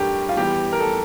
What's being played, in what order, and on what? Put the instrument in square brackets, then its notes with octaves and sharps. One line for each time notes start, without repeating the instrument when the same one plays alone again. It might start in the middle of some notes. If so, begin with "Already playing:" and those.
Already playing: [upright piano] A2 G3 D4 A4 [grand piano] G4 A#4
[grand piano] F4
[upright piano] E2 E3 G3 [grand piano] G4
[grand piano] A#4
A4